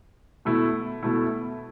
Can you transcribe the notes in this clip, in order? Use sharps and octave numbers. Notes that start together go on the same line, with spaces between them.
B2 A3 E4
B2 A3 E4